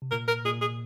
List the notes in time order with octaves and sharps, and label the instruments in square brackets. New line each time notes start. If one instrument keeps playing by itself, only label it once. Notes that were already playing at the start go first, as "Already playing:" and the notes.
[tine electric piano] C3
[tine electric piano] A#2 [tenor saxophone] A#4
[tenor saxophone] A#4
[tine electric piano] A#2 [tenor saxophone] G#4
[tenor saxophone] G#4